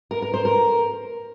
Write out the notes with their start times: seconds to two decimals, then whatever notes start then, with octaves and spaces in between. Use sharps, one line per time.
0.11 A#4
0.22 A#4
0.34 C5
0.45 A#4